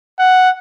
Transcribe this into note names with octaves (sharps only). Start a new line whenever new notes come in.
F#5